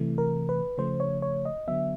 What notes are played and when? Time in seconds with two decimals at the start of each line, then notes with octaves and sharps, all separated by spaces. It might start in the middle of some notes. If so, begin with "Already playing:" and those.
Already playing: C3 E3 A3
0.18 A#4
0.49 B4
0.78 C#3 F3 A3 C5
1.00 C#5
1.22 C#5
1.45 D#5
1.68 D3 F#3 B3 E5